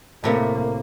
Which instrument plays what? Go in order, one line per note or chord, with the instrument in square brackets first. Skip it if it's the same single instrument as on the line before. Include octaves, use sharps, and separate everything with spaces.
[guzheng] A2 C3 A3 [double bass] A#3